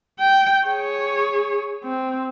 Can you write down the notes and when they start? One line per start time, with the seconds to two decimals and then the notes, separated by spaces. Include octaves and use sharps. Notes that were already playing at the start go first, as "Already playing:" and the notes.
0.20 G5
0.68 G#4 C#5
1.84 C4